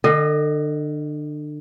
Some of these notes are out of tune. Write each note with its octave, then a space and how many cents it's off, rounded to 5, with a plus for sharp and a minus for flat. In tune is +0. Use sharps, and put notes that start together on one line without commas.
D3 +30 D#5 +0